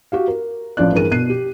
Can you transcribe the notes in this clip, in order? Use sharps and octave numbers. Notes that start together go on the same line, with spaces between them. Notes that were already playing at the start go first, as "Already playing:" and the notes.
F#4 G4 F5
A#4
A1 F3 F4 D5 F#6
G1 E3 G#4 A#4 D#7
B2 F#6 C7 D#7
G4